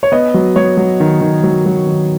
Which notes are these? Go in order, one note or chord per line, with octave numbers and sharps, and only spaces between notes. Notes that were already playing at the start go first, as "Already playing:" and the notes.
C#5
B3 D#5
F#3
F#3 C#5
F#3
D#3
D#3
F#3
F#3
D#3